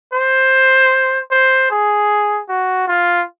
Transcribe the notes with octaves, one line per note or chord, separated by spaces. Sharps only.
C5
C5
G#4
F#4
F4